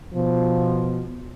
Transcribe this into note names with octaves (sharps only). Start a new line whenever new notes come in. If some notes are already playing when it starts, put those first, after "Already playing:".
B2 F3